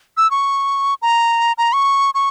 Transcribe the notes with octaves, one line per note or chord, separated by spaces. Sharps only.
E6
C#6
A#5
A#5
C#6
C#6